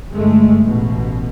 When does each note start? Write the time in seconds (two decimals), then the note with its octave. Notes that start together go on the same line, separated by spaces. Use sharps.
0.10 G1 G#3 A3
0.64 A1 B2